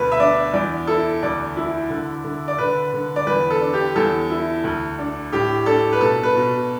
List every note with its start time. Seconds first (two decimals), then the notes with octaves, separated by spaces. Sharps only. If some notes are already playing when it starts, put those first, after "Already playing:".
Already playing: D2 B2 B4
0.12 E5
0.19 D4 D5
0.54 E2 D5
0.87 E4 A4
1.22 D2 D5
1.57 E4
1.90 D3
2.24 D3
2.48 D5
2.58 D3 B4
2.93 D3
3.16 D5
3.27 E2 B4
3.50 A4
3.61 D4
3.73 G4
3.96 E2 A4
4.30 E4
4.64 D2
4.98 D4
5.32 A2 G4
5.66 D4 A4
5.93 B4
6.01 B2 A4
6.23 B4
6.35 B2